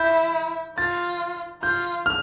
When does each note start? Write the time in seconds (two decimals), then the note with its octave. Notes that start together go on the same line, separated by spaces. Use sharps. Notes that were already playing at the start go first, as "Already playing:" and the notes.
Already playing: E4 G6
0.78 F4 A6
1.62 F4 G6
2.06 F6